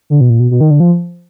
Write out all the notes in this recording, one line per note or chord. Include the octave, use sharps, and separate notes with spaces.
D3
B2
A#2
B2
B2
D#3
D3
F3